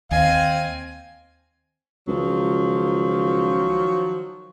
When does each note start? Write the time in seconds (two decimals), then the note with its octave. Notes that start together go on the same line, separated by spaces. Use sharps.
0.11 D#2 C4 D#5 F5 G#5
2.08 C#2 D#3 F3 F#3